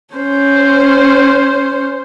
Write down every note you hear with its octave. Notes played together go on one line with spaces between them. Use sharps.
C#4 C5